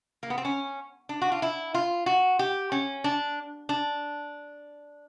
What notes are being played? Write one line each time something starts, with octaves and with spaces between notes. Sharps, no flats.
A#3
B3
C4
C#4
D4
F#4
F4
E4
F4
F#4
G4
C#4
D4
D4